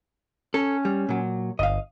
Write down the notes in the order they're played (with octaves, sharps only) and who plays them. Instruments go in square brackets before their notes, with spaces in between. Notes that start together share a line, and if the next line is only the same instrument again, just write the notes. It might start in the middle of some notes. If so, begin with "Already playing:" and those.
[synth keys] C#4 [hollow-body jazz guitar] A4
[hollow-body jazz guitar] G3
A#2 F#3
[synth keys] G1 [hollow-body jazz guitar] D#5 F5